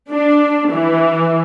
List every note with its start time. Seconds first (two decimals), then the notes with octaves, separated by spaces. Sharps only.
0.10 D4
0.70 E3